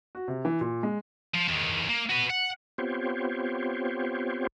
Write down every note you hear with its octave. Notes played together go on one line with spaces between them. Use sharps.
F#4
C3
E3
A#2
G#3
F3
E2 D#3
A#3
F#4 B4
F#5
B3 C4 F4 G4 C5 C#5